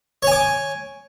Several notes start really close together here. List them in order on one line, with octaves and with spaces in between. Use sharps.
C#5 G#5 D6